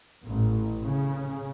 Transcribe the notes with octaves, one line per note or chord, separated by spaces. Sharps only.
A1
C#3